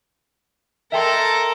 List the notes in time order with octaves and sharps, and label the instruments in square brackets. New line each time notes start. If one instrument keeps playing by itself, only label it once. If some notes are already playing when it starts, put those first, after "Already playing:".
[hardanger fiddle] A4 A#4 [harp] E5 G5 C6